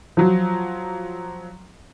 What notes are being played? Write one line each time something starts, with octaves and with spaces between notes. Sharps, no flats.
F3 F#3